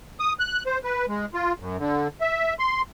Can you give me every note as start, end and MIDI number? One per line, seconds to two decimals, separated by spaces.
0.20 0.33 87
0.39 0.63 90
0.66 0.78 72
0.84 1.05 71
1.08 1.25 56
1.34 1.53 65
1.60 1.77 42
1.79 2.08 50
2.21 2.54 76
2.59 2.82 84